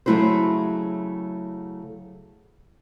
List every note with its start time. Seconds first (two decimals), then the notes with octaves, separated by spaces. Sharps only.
0.06 C#3 F#3 A3 E4 F#4 C5